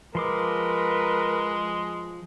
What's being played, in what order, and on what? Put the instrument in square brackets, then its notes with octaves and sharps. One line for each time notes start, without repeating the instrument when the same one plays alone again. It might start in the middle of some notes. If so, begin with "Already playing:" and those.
[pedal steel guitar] F3 C6 D6 [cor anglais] G#3 [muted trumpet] A#4 [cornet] B4